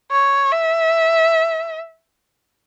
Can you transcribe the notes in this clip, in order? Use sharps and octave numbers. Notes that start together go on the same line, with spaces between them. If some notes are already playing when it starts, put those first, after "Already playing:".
C#5
E5